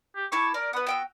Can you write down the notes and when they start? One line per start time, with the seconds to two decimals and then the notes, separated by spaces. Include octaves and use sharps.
0.16 G4
0.32 E4 A4 C#6 D6
0.54 A#4 D5
0.73 B3 B4 F#5
0.87 F#4 G5 E6